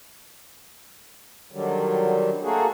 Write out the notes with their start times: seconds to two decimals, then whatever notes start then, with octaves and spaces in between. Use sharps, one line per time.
1.52 D3 D#3 F#3 G3
2.43 A3 A#3 F#4 G#4